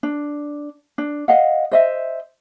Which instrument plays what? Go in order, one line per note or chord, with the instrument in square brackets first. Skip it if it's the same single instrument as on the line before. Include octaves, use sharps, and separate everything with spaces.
[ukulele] D4
D4
D#5 F5 F#5
C5 D#5 E5